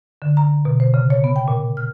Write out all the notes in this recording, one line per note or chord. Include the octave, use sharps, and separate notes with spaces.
D3
A#5
B2
C5
C#3
C#5
B3
G5
A#2
F6